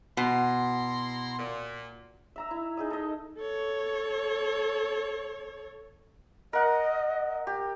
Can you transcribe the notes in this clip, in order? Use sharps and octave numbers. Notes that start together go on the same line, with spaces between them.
B2 E4 A#5 C6
A#2
E5 A#5 E6
E4
D#4 G#4 D#5
A4 D#5
A4 C#5
A#4 D#5 F#5
G4